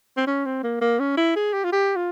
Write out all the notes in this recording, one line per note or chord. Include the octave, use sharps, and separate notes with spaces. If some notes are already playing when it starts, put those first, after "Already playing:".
C4
C#4
C4
A#3
A#3
C#4
E4
G#4
G4
F4
G4
F4